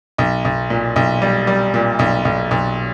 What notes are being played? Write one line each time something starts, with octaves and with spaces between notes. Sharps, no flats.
B1
B1
A#2
B1
G3
G3
A#2
B1
B1
B1